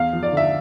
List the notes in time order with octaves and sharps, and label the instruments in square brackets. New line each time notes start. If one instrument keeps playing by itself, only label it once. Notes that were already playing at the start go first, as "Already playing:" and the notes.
Already playing: [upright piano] E2 F5
F3
D5
D3
E5